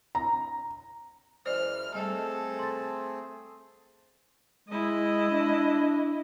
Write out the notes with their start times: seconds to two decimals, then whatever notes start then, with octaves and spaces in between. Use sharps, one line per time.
0.15 A#5
1.46 F#2 E3 G#3 C5 D5 F6
1.94 G3 A3 C4 G#4 A4 D#5
2.59 C6 A6
4.69 G#3 E4 D#5
5.30 D4